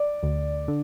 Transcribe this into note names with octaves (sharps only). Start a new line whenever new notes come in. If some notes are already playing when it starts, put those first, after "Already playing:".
Already playing: D5
D2
D3